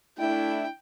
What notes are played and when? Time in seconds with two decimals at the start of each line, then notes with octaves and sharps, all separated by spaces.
0.18 A3 D4 E4 G5